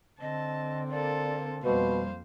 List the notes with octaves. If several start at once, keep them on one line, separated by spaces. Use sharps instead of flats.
D3 C4 D#5 A5
A#3 A4 D5
F2 B2 G3 A#3 C5 F5